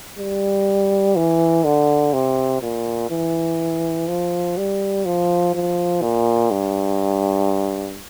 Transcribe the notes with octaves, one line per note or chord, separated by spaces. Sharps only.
G3
E3
D3
C3
A#2
E3
F3
G3
F3
F3
A#2
G2